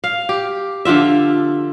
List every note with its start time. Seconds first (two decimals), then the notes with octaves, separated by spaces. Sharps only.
0.04 F5
0.29 G4
0.85 D3 F3 F4 E5